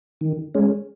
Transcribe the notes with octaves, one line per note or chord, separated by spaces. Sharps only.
D#3
G#3 C#4